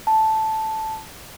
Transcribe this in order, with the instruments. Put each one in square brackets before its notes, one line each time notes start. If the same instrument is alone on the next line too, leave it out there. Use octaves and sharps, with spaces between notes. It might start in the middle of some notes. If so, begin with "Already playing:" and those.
[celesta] A5